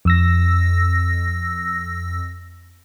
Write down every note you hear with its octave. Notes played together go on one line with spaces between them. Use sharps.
F2 E6 A#6